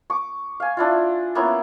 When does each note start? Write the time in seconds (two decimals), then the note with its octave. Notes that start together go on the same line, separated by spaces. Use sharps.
0.10 C#6 D6
0.60 F5 G#5
0.77 D4 E4 F4
1.35 A#3 B3 C#4 E4